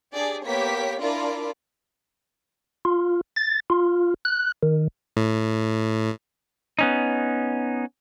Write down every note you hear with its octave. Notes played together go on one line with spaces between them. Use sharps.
D4 G4 G#4 D5
A#3 B3 G4 C#5 B6
D4 E4 F4 A#4 D5
F4
A6
F4
F#6
D#3
A2
B3 C#4 D#4